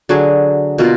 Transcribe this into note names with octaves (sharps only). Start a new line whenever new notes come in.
D3 F#3 D4 G#4
B2 A#3 F4